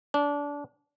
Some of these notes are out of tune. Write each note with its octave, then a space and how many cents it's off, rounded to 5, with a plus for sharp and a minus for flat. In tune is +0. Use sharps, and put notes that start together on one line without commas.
D4 -25